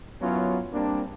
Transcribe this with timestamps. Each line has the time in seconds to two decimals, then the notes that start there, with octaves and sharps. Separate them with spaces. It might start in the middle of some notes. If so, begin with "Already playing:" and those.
0.22 F#2 F#3 B3 C#4 E4 F4
0.73 G3 A#3 C4 D4